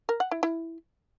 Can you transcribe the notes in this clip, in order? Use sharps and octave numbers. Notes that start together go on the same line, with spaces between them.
A#4
F#5
E4
E4